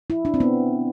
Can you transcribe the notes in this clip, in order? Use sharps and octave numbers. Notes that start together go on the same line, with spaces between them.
E4
D4
C4
B3